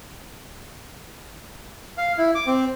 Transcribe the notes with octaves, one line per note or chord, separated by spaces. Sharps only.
F5
E4
D6
C4